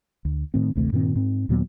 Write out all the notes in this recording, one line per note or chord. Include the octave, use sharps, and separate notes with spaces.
D2
A2 D#3 C4
A1 D2 C3 A3
G2 A#2 D#3 C4
G#2 C4
D#2 A#2 F#3 B3